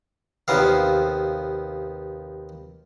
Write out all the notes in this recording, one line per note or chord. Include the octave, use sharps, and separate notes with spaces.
D#2 C3 B3 F5